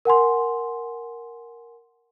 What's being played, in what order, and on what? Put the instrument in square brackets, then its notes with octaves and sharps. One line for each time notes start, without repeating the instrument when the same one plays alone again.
[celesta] A#4 F#5 G#5 C6